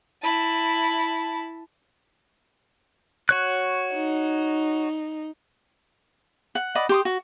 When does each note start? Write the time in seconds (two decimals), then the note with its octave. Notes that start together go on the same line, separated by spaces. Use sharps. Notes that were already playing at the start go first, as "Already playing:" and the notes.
0.23 E4 A5
3.29 F#4 C#5 F#6
3.94 D#4
6.55 F#5
6.75 D5 D#5 F#5 B5
6.89 G4 C6 D#6
7.05 F#4